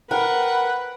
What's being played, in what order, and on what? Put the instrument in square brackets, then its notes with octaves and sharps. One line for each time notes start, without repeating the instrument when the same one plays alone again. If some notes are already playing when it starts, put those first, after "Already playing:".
[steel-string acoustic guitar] A#4 [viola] B4 [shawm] F#5 [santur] G5